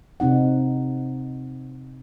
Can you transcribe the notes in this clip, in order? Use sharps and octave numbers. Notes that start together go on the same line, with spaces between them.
C3 C4 D#4 F#5